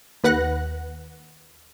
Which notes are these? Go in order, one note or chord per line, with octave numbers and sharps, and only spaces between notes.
D#2 B4 F#5 F#6 A#6